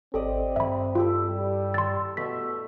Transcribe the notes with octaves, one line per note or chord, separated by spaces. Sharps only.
G#1 C4 G4 A4 D5 D#5
G2 E5 B5
E4 F4 G4 A4
G3
C6 E6 A6
B2 A3 E5 B6